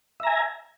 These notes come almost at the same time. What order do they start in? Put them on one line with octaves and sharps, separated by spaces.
E5 A#5 G#5